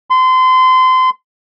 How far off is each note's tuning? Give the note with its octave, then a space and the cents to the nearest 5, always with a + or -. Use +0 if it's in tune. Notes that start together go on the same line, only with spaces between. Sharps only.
C6 -30